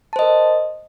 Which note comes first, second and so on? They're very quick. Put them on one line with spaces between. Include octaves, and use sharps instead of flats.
A5 C5 D#5 A#4